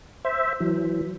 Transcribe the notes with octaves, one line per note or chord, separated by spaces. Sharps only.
C5 E5
E3 F#3